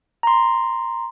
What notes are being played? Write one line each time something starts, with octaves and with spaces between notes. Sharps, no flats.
A#5 C6